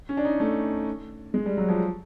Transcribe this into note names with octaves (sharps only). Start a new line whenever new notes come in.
C#4
D4
D#4
A3
G#3
G3
F#3
F3